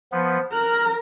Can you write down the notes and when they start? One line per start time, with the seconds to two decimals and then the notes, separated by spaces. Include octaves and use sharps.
0.12 F3 B3
0.52 A#4 F6 F#6